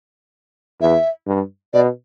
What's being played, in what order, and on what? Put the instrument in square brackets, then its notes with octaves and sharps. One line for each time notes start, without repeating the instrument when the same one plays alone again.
[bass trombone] E2 [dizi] E5
[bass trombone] G2
[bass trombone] B2 [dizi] D5